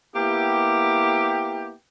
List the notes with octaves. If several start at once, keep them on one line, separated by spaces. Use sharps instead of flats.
A#3 B3 E4 G4